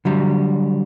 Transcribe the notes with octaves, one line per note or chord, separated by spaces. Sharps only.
D3 F#3 G3